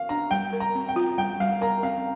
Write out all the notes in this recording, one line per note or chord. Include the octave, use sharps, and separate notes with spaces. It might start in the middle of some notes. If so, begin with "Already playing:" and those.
Already playing: F5
D4 A#5
G3 G5
A#4
A#5
C4
G5
F4
G3 G5
G3 F5
A#4 A#5
C4 F5